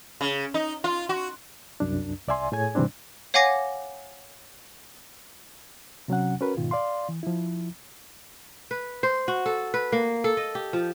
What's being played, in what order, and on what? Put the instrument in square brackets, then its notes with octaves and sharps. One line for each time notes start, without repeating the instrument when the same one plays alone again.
[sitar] C#3
D#4
F4
F#4
[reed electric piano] C2 F#2 D4
C2 D5 E5 G#5 C6
A2 G#4 C#5 G#5 G#6
G#2 C3 E3 G3 C4 D4
[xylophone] C#5 F5 F#5 G#5 D6 A#6
[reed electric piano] C3 F#3 C#4 F#5
C#4 F#4 A#4 B4
G#2 B2 D#3 F4
D5 F5 C6
E3
F3 E4
[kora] B4
C5
F#4
A4
B4
A#3
A4
D#5
G4
F3